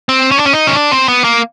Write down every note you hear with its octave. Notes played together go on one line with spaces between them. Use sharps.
C4
C#4
D4
C#4
D#4
C#4
D4
C4
B3
A#3